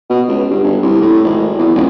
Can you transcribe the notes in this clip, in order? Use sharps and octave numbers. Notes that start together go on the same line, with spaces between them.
B2
C#2
G2
G1
C2
A2
G#1
E2
D#1